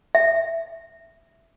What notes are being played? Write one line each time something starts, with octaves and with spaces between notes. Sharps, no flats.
E5